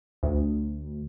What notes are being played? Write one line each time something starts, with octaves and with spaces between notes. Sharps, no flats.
D2